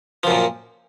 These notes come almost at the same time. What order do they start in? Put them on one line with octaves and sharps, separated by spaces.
F3 F#2 A#2